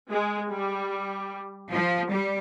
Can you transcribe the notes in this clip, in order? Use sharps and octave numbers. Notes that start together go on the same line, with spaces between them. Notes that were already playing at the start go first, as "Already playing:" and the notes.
G#3
G3
F3
G3